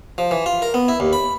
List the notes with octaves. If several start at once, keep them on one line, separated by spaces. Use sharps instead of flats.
F3
E3
F4
A#4
B3
E4
D#2
B5